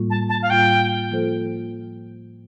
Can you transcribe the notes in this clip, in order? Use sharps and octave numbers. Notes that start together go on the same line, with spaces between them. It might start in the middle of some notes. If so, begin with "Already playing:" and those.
Already playing: A2 G3 A#3 F4
A5
A5
F5
A2 G3 A#3 F4 G5
F3 A#3 F4 A4 C5